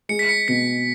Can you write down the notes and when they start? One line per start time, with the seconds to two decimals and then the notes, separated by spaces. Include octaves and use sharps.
0.09 G#3 C#7
0.19 B6
0.29 C#7
0.48 B2 B6